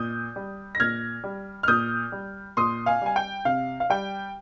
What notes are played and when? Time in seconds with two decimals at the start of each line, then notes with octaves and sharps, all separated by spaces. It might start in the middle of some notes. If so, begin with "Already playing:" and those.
Already playing: A#2 D#6 G6
0.36 G3
0.75 A#6
0.80 A#2 F6 G#6
1.24 G3
1.63 F6
1.68 A#2 D#6 G6
2.12 G3
2.57 A#2 C6 D#6
2.86 F5 G#5
3.02 G3 G#5
3.16 G5
3.45 C3 F5
3.80 F5
3.90 G3 G5